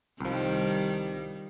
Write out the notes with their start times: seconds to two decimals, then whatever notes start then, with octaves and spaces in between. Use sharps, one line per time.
0.20 C2 D#3 F3 G3